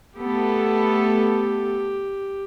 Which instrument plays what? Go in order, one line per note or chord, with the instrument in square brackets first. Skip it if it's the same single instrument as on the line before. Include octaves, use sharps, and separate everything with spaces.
[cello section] A3 B3 A4 [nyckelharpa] G4